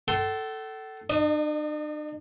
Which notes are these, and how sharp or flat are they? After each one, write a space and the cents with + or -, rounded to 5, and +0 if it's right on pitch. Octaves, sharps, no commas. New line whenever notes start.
A4 +0 G5 -45 C6 +0
D4 +45 D#5 -20